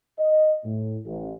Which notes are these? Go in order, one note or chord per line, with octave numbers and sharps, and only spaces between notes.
D#5
A2
A1